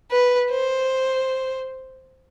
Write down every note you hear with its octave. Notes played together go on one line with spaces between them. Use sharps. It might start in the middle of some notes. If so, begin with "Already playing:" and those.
B4
C5